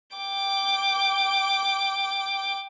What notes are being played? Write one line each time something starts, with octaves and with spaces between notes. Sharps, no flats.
G5 D6